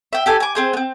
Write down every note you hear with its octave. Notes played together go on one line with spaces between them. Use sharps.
E5 G5
G4 A4 G#5
G#5 D6
C4 G#4 C5
B3 C4